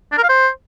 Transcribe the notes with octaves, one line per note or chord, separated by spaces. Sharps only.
D4
A#4
F5
C5